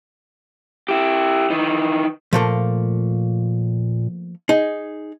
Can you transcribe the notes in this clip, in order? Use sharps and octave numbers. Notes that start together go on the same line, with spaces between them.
E4 G4
D#3 E3
A#2 F3 A3 A#3
D#4 G#4